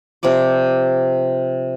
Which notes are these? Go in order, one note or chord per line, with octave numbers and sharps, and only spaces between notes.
C3 F3 D5 D6